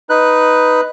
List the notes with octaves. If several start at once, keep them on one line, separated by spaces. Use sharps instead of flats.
D#4 B4 F#6